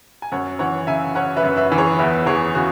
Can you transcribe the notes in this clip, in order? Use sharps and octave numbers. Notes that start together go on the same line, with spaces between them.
G#5
F#2 C#5 F#5
E3 C#5 F#5
C#3 E5 G#5
C#4 C#5 F#5
B4 E5
F#2
B4 E5
E3
G#4 C#5
E2 B4 E5
E3 G#4 C#5
C#3 F#4